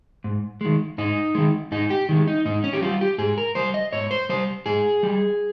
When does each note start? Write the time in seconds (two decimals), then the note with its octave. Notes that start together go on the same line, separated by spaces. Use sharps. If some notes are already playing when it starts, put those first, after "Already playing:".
0.24 G#2
0.61 D#3 G#3
0.98 G#2 D#4
1.35 D#3 G#3
1.72 G#2 D#4
1.90 G4
2.09 D#3 G#3
2.28 D#4
2.45 G#2 D#4
2.64 C#4
2.73 G4
2.82 G3 F4
3.01 G4
3.18 G#2 G#4
3.38 A#4
3.55 G3 C5
3.74 D#5
3.93 G#2 C#5
4.11 C5
4.29 G3 C5
4.66 G#2 G#4
5.03 G3